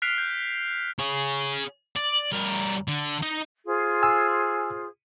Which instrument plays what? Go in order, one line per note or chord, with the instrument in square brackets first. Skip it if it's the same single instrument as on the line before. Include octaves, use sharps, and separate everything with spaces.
[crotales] F6 F#6 B6 C7 D7 F7
G6
[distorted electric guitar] G#4 C#5
D5
G2 A#4
D3
D#4 D#5
[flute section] F4 G#4 C5
[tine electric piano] G#5 E6